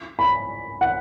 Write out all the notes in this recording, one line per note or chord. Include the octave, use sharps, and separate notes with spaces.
B5
F#5